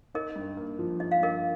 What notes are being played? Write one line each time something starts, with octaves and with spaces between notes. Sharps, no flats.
D#4 A#4 D#5
G2
A#3
F3
D#4 D#5
F5
G2 A#4 D#5